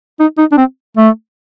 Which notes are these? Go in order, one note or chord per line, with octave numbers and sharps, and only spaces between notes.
D#4
D#4
D4
C4
A3